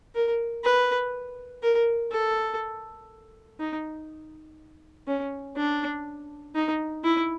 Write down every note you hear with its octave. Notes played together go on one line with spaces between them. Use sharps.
A#4
B4
A#4
A4
D#4
C#4
D4
D#4
E4